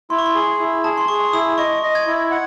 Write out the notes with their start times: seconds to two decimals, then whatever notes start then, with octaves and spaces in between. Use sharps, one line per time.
0.10 E4 C6
0.18 C#6
0.26 C6
0.35 G#4
0.59 E4
0.84 G#4 A5
0.98 C6
1.08 G#4 C#6
1.33 E4 D#6
1.58 D#5 C#6
1.83 D#5
1.95 G#6
2.07 E4
2.31 F#5